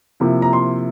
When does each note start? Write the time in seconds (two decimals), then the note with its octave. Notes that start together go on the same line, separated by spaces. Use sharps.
0.20 C3 F3 A#3 E4
0.42 A#5
0.53 C6